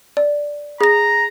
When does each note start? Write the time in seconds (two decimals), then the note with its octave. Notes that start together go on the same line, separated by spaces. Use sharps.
0.17 D5
0.81 G#4 A#5 A#6